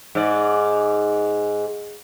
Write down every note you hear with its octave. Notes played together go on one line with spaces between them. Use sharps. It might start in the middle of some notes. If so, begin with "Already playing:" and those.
G#2 D5